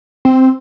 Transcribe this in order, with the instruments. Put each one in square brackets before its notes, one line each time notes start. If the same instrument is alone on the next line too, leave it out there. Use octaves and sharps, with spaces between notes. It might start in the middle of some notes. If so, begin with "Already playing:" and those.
[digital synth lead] C4